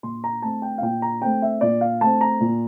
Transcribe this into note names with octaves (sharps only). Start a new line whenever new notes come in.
A#2 C6
A#5
A3 C4 A5
G5
F5
A#2 G5
A#5
A3 C4 G5
E5
A#2 D5
F5
A3 C4 A5
A#5
A#2